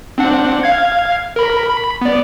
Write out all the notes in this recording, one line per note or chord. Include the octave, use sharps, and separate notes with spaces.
C4 D4 F#5
F5 G#6
A#4 B5
B5
B3 D5